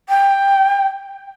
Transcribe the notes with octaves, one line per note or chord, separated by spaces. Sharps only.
G5